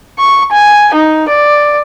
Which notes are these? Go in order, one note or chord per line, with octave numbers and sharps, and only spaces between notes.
C#6
G#5
D#4
D5